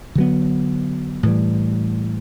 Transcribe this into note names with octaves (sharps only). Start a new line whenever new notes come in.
D3 F#3 B3
A2 E3 G3